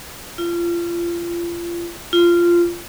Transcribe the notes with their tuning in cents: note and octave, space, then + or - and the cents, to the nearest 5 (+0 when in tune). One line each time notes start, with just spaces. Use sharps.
F4 -30
F4 -15